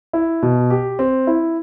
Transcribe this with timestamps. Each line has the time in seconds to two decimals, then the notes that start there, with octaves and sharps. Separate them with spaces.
0.13 E4
0.42 B2
0.70 G4
0.99 C4
1.27 E4